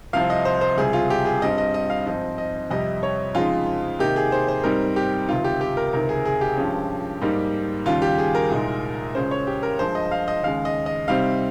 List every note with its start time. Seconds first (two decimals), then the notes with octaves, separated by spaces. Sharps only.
0.13 C2 C3 F3 C4 F5
0.30 D#5
0.45 C5
0.61 C5
0.77 C#2 C3 G3 G#4
0.93 F4
1.10 G4
1.25 G#4
1.42 G2 G3 C4 D#5
1.58 D#5
1.74 D#5
1.90 F5
2.06 G#2 F3 C4 D#4 D#5
2.38 D#5
2.71 F2 C3 G3 D#5
3.03 C#5
3.35 F2 C#3 G#3 D#4 F4
3.99 C3 D#3 A#3 D#4 G4
4.16 G#4
4.32 C5
4.48 C5
4.63 G#2 G3 C4 D#4 A#4
4.96 G4
5.29 C#2 C3 D#3 F4
5.44 G4
5.61 G4
5.77 A#4
5.93 C#2 C3 D#3 A#4
6.09 G#4
6.25 G#4
6.41 G4
6.57 G2 F3 G#3 C#4
7.22 G#2 G3 A#3 D#4
7.86 D#2 C#3 G3 F4
8.02 G4
8.18 G#4
8.35 A#4
8.50 C2 A#2 G#3 D#4
9.15 C#2 C#3 G#3 C#4 C5
9.31 C#5
9.47 G4
9.63 A#4
9.79 G2 F3 G#3 C5
9.95 D#5
10.11 F5
10.28 D#5
10.43 D#2 C#3 G#3 F5
10.65 D#5
10.86 D#5
11.08 C3 G3 C4 D#4 F5